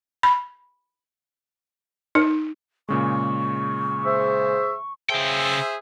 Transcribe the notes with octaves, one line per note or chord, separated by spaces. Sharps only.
B5
D#4
A#2 C#3 G#3 C#6
G#4 C5 E5
C#3 G#4 C5 E5 G5